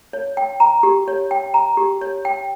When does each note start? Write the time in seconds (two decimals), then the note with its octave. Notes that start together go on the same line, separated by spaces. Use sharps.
0.13 C#5
0.37 G5
0.60 A#5
0.83 G4
1.08 C#5
1.31 G5
1.54 A#5
1.77 G4
2.01 C#5
2.25 G5